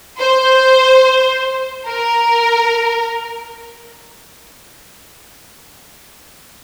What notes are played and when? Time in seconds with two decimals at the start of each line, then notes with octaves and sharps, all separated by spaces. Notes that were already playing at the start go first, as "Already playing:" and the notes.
0.19 C5
1.88 A#4